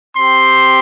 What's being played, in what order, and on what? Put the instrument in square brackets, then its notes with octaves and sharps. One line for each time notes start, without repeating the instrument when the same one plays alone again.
[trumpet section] C4 G4 C6